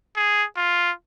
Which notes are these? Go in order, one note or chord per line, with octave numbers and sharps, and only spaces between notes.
G#4
F4